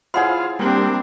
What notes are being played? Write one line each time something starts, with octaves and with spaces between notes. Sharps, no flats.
E4 F4 G#4 C5 C#5 F#5 C6
G3 A#3 C4 D4